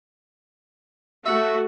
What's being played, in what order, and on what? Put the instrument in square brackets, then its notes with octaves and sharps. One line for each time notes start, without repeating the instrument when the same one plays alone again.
[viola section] A3 F#4 [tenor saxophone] E5